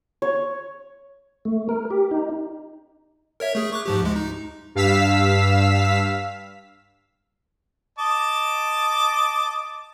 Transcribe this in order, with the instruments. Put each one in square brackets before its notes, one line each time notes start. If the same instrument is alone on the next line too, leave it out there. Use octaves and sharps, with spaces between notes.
[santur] C#5
[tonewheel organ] A3
A#4
G4
D#4
[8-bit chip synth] A#4 C#5 E5
A3 G#4
C#6 D6 F#6
G#2 F3 G4
D2 G#3
D#4
[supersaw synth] G2 F5 E6 B6
[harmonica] D#5 A5 D6